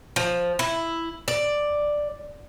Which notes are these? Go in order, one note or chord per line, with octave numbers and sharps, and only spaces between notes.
F3
E4
D5